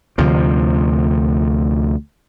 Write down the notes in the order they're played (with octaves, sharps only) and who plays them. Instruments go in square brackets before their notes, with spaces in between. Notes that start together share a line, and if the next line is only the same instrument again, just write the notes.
[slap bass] D2 C3 F3